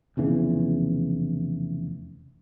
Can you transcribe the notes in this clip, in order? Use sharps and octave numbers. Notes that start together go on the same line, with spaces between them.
F1 E2 C#3 E3